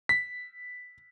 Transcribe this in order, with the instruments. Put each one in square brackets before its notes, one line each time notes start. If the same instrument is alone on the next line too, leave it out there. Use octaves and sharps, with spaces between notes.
[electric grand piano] B6